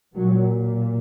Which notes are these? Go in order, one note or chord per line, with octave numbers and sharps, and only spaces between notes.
A#2 F#3